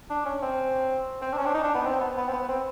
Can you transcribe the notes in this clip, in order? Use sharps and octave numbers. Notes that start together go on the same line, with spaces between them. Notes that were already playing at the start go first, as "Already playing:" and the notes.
D4
C#4
C4
C4
D4
C#4
D4
D#4
D4
B3
C4
B3
B3
C4
B3
C4